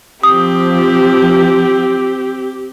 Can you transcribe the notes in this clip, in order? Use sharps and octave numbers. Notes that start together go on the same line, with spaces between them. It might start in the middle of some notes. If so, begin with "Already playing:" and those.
F3 C4 G4 D#6